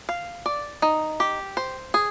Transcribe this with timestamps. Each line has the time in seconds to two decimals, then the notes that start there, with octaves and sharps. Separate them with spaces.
0.09 F5
0.46 D5
0.82 D#4
1.20 G4
1.57 C5
1.94 G#4